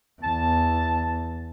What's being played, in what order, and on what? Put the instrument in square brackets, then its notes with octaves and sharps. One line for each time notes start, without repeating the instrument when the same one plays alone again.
[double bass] E2 [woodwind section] A5